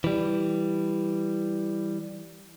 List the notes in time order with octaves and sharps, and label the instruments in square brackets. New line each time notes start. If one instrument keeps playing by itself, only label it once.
[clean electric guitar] E3 G3